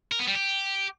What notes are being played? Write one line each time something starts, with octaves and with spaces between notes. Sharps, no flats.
A#4
B3
G3
G4